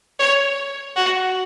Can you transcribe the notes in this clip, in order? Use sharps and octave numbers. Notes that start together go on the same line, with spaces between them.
C#5
F#4